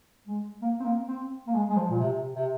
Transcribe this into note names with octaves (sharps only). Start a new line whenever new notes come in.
G#3
A#3
C4
A#3
C4
A#3
G#3
G#3
F3
A#2
C3
C3